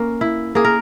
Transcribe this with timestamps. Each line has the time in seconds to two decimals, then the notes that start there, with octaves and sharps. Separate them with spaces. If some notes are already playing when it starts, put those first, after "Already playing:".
Already playing: A#3 C#4
0.21 E4
0.55 A#3 G#4
0.65 A#4